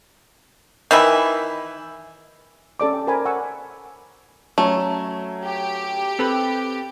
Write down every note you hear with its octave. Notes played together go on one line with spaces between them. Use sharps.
D#3 E3 E4
C#4 A4 D5 D6
G5
A#4 C5 C#5 G#5 A5 B5
F#5 G#5 C#6 E6
F#3 A3 C#4
G4
C4 A4 B4 B5